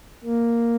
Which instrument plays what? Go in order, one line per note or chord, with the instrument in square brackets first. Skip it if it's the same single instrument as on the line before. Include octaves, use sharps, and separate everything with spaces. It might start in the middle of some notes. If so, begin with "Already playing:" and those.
[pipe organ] A#3